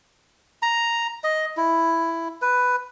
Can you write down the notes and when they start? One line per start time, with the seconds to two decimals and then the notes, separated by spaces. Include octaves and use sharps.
0.62 A#5
1.24 D#5
1.57 E4
2.42 B4